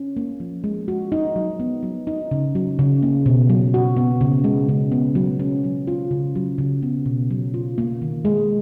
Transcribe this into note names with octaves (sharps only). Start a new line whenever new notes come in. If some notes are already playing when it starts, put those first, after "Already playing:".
Already playing: C#4
A#3
F3
G#3
F#4
D#4
F#3
B3
F#3
D#4
C#3
F#3
C#3
A#3
B2
F#3
F#4
B3
C#3
G#3
C#3
B3
F#3
C#4
F#3
F4
C#3
F#3
C#3
B3
B2
F#3
F4
A#3
D#3
G#3